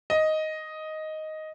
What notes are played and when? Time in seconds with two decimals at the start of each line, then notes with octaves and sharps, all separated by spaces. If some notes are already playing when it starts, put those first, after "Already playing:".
0.10 D#5